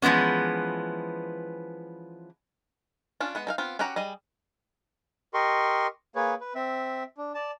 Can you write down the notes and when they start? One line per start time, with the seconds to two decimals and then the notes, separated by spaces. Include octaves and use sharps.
0.02 E3 F3 G#3 B3 C#4
3.20 C#4 D4 F4
3.35 G#3 B3 F#5
3.47 D#4 A4 F5
3.58 B3 C4 F4
3.79 C#4 F#4 G4 F#5 A#5
3.96 G3 G#4 D#5
5.34 G4 A#4 D#5 C6 C#6
6.15 A#3 G#4 B4 C#5
6.41 B4
6.55 C4 E5
7.18 D4
7.35 D5 A5